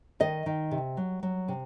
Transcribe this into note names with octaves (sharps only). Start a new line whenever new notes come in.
D#3 D#5
D#3
C3
F#3
F#3
C3